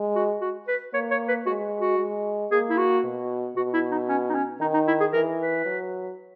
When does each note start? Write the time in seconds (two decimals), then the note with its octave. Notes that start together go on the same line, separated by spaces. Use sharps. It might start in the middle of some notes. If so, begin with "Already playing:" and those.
Already playing: G#3
0.15 F#4
0.41 F#4
0.67 B4
0.94 A#3 C#5
1.11 C#5
1.28 B4
1.46 G#3 F#4
1.81 F#4
1.99 G#3
2.51 A#3 G#4
2.69 E4
2.77 F#4
3.04 B2
3.56 B2 F#4
3.74 E4
3.91 D#4
4.09 C#4
4.29 D#4
4.35 C#4
4.60 D#3 D#4
4.74 D#4
4.87 E4
5.00 G#4
5.13 E3 A#4
5.39 B4
5.66 F#3